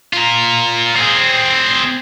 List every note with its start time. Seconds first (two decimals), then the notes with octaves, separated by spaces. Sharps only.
0.13 F4 A#4
0.95 C4 G#4